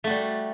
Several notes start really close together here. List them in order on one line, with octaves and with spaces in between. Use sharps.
A3 F#4 G3